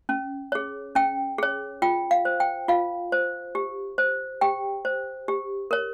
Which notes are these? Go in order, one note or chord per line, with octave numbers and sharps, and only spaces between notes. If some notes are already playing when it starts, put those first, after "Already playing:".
C#4
G#4 C#5
C#4 G5
G#4 C#5
F4 G5
F5
C5
G5
F4 F5
C5
G4
C5
G4 G5
C5
G4
A#4 C#5